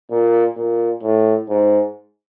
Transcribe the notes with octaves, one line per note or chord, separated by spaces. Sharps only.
A#2
A#2
A2
G#2